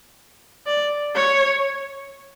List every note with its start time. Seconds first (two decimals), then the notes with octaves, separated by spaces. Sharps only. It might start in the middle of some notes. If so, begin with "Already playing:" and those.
0.66 D5
1.15 C#5